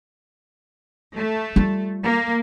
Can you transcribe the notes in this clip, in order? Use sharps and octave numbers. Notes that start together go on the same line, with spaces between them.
A3
G3 F4
A#3